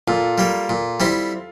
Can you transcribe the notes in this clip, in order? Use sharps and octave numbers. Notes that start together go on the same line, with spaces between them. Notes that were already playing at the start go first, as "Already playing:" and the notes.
A#2 F4 A4
G3 A#3
A#2
G3 C4 E4